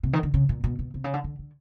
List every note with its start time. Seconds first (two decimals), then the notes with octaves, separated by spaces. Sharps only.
0.03 C3
0.13 D#3
0.23 D3
0.34 C#3
0.49 A#2
0.64 B2
0.79 B2
0.94 C3
1.04 C#3
1.14 D3
1.24 D3
1.39 D3